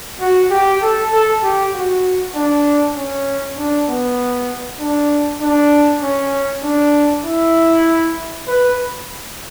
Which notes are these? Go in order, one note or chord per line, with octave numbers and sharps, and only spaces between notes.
F#4
G4
A4
A4
G4
F#4
D4
C#4
D4
B3
D4
D4
C#4
D4
E4
B4